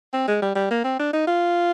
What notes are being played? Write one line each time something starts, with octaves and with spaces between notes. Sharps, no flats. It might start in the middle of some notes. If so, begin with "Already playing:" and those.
C4
G#3
G3
G3
A#3
C4
D4
D#4
F4